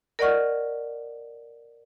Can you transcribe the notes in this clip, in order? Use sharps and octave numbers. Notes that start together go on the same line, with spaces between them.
A#4 D5 D#5 F#5 C#6 F6